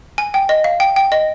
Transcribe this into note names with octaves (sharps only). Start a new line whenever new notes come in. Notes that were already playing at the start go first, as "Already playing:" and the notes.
G#5
G5
D#5
F5
G5
G5
D#5